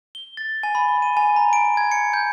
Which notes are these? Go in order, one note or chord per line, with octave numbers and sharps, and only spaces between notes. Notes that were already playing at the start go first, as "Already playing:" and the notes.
G7
A6
G#5
B5
G7
D#7
G#5
A#5
D7
G#6
C#7
G6